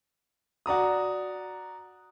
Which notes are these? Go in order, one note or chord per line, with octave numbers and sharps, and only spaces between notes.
F#4 D5 A#5 D#6